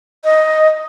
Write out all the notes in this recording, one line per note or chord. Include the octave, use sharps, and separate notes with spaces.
D#5